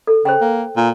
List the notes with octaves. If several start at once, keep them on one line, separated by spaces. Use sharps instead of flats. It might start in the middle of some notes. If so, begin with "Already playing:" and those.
A4
C#3 C5 G5
A#3
A#2